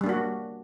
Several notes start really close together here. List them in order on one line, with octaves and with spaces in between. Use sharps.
G3 D4 A#3 F#4